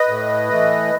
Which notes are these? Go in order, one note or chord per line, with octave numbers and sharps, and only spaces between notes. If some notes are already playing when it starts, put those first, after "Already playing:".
Already playing: B4 D#5
A2
E3 A3